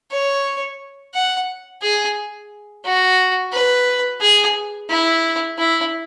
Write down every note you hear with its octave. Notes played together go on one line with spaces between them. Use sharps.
C#5
F#5
G#4
F#4
B4
G#4
E4
E4